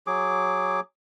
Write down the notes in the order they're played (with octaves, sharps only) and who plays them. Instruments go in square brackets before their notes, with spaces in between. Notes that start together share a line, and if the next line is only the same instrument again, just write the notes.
[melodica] F#3 G#4 D6